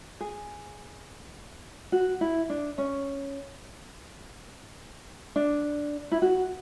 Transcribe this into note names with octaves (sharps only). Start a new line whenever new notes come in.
G#4
F#4
E4
D4
C#4
D4
E4
F#4